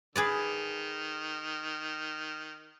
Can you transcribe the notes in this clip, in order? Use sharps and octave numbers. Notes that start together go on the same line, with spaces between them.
D#3 G#4 B4 D5